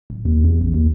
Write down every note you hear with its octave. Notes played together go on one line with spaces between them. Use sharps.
D1
D#2
E2
A1
D#2